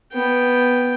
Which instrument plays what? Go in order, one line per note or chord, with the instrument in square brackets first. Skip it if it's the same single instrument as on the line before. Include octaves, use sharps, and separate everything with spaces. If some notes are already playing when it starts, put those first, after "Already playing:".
[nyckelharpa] B3 G5